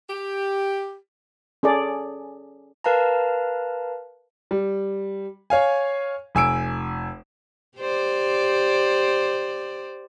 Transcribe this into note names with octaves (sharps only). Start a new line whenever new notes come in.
G4
C#4 G#4 A4 D5
A#4 B4 F5 A5 A#5
G3
C#5 F5 G#5
F1 G#5 E6 D7
G4 C5 D5